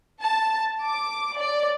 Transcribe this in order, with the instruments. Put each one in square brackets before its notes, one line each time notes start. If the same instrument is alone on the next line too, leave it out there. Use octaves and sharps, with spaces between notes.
[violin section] A5
D6
D5